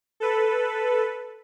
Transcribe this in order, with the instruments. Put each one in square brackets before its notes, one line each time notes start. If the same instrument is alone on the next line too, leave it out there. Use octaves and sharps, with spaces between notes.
[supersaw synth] A4 B4